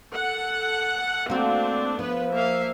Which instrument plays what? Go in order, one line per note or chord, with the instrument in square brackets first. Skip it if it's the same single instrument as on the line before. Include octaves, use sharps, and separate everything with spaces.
[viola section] A4 F#5
[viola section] A3 C4 D4 [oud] A#3 F#4
[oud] F3 [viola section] B3 B4
[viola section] A#3 E5 F5